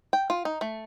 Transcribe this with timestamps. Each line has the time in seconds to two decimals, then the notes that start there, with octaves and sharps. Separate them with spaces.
0.13 G5
0.30 F4
0.45 D#4
0.61 A3